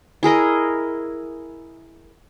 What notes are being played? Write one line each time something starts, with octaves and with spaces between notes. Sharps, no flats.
E4 G#4 A#4 D#5